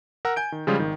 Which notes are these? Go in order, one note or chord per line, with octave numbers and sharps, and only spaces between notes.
A#4 F#5 A#5 E6
G#5 G6 D7
D#3
C#3 F3 G3 G#3 F4 G#4
G#1 D#3